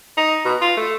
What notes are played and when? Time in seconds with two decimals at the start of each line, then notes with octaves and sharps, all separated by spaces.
0.18 D#4
0.45 B2
0.62 F4
0.77 A3